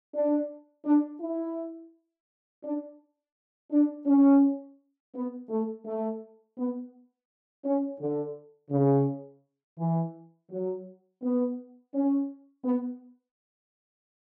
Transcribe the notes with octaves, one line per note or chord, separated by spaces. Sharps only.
D4
D4
E4
D4
D4
C#4
B3
A3
A3
B3
C#4
D3
C#3
E3
F#3
B3
C#4
B3